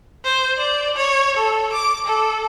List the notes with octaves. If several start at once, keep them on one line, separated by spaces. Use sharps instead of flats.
C5
D5
C#5
A4
D6
A4